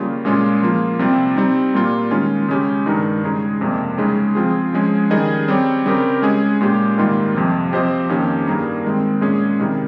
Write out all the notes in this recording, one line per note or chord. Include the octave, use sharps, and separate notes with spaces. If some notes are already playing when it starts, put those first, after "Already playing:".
Already playing: C#3 G3 A#3 F4
A#2 G#3 C#4 F4 G#4
F3 A#3 F4
C3 G3 C4 F4
G3 C4 D#4
A#2 G3 A#3 F4
D#3 G#3 C#4 F4
C#3 G#3 C#4 G4
G2 D#3 G#3 D#4
C#3 G#3 D#4 G#4
F2 C3 G3 A#3
C#3 G#3 D#4 G#4
F3 C4 F4 G#4
F3 G#3 C#4 G#4
D#3 G3 C#4 G#4 D#5
G3 C4 G4 C#5
C#3 G3 C4 G4 A#4
G#3 C#4 G#4 D#5
A#2 G#3 C#4 G4
G#2 D#3 G3 A#3 F4
F2 C3 F3 C4
F3 C4 G4 C5 D#5
F2 D#3 A#3 C#4 G4
G2 G3 A#3 D#4 G#4
D#3 G#3 C4
A#2 G#3 C#4 G#4 D#5
C3 D#3 G3